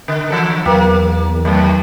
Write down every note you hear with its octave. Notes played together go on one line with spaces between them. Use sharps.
D3
E3 F3 A4
E2 F#3 A#3 B4 G5
D#2 D#3 F#3 A3